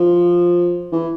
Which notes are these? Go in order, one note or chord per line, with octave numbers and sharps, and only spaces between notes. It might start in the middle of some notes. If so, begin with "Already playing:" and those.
Already playing: F3
E3